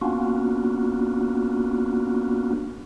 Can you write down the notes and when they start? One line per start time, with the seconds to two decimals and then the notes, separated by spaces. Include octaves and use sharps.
0.01 A#3 B3 C#4 D4 F4 F#4